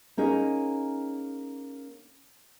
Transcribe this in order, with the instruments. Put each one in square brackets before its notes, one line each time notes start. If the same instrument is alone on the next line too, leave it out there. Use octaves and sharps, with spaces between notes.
[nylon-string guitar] A#3 C#4 D#4 G#4